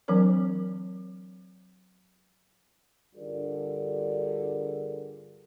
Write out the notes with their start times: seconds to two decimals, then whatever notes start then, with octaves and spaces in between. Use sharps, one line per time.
0.08 E3 F#3 C4 D4 A#4 C#5
3.15 G2 D3 F4 G#4 A#4 D5